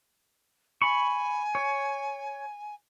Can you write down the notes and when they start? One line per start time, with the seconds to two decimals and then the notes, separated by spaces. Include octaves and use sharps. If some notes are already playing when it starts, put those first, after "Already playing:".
0.82 G#5 B5 C#6
1.55 C#5